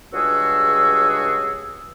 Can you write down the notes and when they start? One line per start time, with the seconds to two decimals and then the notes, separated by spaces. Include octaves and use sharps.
0.13 C#2 G2 F#4 G#4 E6